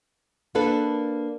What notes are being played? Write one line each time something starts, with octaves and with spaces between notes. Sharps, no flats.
A#3 D4 A4 B4